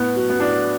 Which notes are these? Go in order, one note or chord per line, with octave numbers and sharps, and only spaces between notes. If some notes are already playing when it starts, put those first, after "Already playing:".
Already playing: A2 B3
F#3
B3
A2 D4